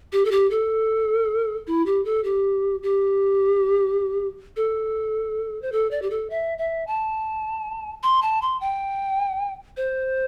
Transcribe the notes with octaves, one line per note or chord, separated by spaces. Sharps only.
G4
A4
G4
A4
E4
G4
A4
G4
G4
A4
C5
A4
D5
G4
A4
E5
E5
A5
C6
A5
C6
G5
C5